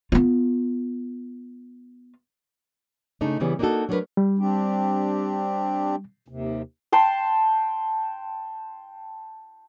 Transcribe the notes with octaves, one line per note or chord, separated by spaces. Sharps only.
B3 F4
C#3 A3 D4 D#4
C#3 E3 G3 B3
A#3 D4 D#4 F4 F#4 A4
F#3 A3 D4 F4 A#4 B4
G3
C4 D4 G4
D#2 C3
G5 A5 C6